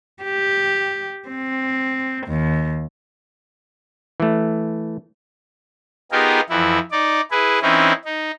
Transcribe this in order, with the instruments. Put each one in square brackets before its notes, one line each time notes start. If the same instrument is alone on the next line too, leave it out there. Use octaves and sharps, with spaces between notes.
[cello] G4
C4
D#2
[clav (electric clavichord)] E3 A3
[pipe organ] B3 D#4 F4 G4 G#4 A#4
F2 E3 E4
D#4 D5
E4 G#4 B4
E3 C4 C#4 D#4 E4
D#4